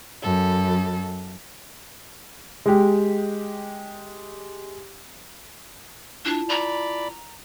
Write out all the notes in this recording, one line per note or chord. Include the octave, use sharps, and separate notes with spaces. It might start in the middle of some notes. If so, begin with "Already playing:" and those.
F#2 A4
G#3 G4
D4 E4 F4 A5
D5 A#5 B5